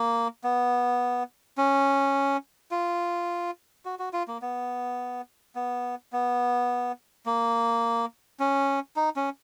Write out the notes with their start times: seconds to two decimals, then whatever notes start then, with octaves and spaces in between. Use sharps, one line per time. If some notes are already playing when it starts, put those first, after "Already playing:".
Already playing: A#3
0.44 B3
1.57 C#4
2.71 F4
3.85 F#4
3.99 F#4
4.13 F4
4.28 A#3
4.42 B3
5.55 B3
6.13 B3
7.26 A#3
8.40 C#4
8.96 D#4
9.16 C#4